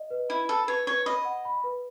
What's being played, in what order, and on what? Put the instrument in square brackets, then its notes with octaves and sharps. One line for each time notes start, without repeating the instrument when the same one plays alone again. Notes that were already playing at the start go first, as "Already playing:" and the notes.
Already playing: [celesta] D#5
B4
[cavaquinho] E4 [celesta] B5
[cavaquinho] A4 [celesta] B5
[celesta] B4 [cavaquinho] C#5
[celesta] B4 [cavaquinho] C#5
[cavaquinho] D#5 [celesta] B5
[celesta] F#5
B5
B4